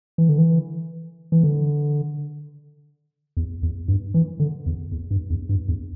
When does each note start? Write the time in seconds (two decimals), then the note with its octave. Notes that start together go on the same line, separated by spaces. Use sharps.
0.18 E3
0.29 D3
0.38 E3
1.32 E3
1.43 D3
3.37 E2
3.63 E2
3.88 G2
4.14 E3
4.40 D3
4.66 E2
4.92 E2
5.11 G2
5.30 E2
5.49 G2
5.68 E2